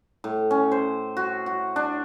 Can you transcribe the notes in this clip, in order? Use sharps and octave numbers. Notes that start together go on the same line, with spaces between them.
A2
C#4
C5
F#4
F#4
D4